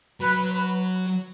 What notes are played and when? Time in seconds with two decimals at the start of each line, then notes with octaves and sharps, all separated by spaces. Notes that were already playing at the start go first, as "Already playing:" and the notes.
0.20 F#3 B4
0.51 B4